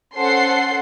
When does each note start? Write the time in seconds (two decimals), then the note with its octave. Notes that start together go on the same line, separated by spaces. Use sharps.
0.16 C#4 A4 C5 F#5 C6 C7